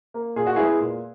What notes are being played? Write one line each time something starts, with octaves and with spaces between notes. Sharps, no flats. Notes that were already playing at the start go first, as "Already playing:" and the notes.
A#3
A#2 G#4
F#4
G#3 B3 E4 G#4
A#2